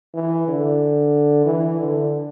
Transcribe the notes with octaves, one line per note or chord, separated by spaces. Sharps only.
E3
D3
E3
D3